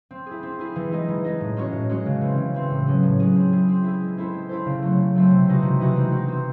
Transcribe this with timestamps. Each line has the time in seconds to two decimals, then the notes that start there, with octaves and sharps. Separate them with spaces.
0.11 C4
0.26 E4 G#4
0.43 C4
0.59 E4 G#4
0.76 E3
0.92 G#3 D#4 G#4 D#5
1.08 E3
1.24 G#3 D#4 G#4 D#5
1.41 A2
1.57 G#3 C#4 F#4 C#5
1.73 A2
1.90 G#3 C#4 F#4 C#5
2.06 C#3
2.21 E3 C4
2.38 C#3
2.54 E3 C4
2.70 A2
2.87 F#3 C#4 G#4
3.03 A2
3.19 F#3 C#4 G#4
3.36 C4
3.52 E4 G#4
3.69 C4
3.84 E4 G#4
4.00 G#3
4.17 C4 E4 A4 C5
4.33 G#3
4.49 C4 E4 A4 C5
4.66 C#3
4.82 F#3 A3 C4
4.98 C#3
5.15 F#3 A3 C4
5.31 C3
5.47 E3 G#3 D#4 F#4
5.63 C3
5.80 E3 G#3 D#4 F#4
5.96 C4
6.12 D#4 F#4
6.28 C4